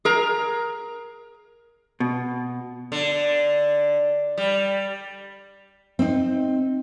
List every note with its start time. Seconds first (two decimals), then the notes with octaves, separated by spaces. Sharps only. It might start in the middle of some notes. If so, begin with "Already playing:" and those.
0.05 G#4 A#4 A#5
2.00 B2
2.92 D3
4.38 G3
5.99 C4 D#4